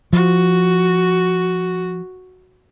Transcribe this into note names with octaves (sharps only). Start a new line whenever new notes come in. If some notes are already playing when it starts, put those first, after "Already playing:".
F3 F#4